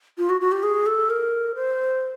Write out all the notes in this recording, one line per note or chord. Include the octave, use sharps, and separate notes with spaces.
F4
F#4
F#4
G4
G#4
A4
A#4
C5